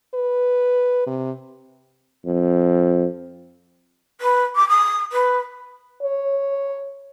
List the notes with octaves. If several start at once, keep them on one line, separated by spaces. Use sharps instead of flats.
B4
C3
F2
B4
D6
D#6
B4
C#5